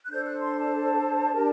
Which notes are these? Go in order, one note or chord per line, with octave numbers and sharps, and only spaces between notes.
F#6
D4 A4 C5 G6
F#6
C6
A5
D4 G4 A#4